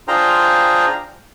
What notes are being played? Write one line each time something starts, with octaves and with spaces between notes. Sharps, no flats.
D4 F4 G#4 C5 G5 A#5